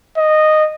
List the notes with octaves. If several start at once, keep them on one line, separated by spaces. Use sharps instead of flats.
D#5